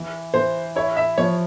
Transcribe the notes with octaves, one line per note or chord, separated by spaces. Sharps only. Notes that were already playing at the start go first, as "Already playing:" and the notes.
Already playing: E3
E3 C5
E4 C#5
E5
F3 C#5